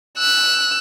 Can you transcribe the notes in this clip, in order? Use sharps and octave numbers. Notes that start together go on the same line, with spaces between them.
E6 F#6